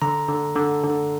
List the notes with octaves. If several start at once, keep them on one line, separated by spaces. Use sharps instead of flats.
D3 A#5
D3
D3
D3